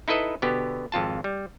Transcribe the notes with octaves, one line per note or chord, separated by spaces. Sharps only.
D#4 E4 A4 B4 D#5
B2 D3 B3 G4
G#1 F2 F4 A5
G3